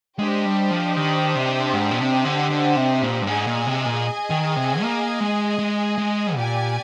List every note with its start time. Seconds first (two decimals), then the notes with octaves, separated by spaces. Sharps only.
0.19 G#3 D4 G4 C5 D#5
0.45 G3
0.71 F3
0.97 D#3
1.35 C3
1.74 G#2
1.91 A#2
1.99 C3
2.25 D3
2.50 D3
2.76 C3
3.02 A#2
3.22 G2
3.27 G#2 G#4 D#5 G#5
3.47 A#2
3.66 C3
3.86 A#2
4.30 D#3
4.56 C3
4.81 A#3
5.20 G#3
5.59 G#3
5.98 G#3
6.36 A#2 G4 D5 G#5